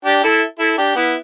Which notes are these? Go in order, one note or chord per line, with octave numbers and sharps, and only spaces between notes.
D4 G4
E4 A4
E4 A4
D4 G4
B3 E4